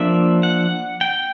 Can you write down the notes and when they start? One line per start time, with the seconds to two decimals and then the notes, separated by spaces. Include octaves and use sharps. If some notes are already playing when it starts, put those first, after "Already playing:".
Already playing: F3 A#3 D4 E5
0.43 F#5
1.01 G5